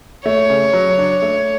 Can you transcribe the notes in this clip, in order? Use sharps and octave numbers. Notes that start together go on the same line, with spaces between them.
A3 C#5
C#3
F#3
D4
A3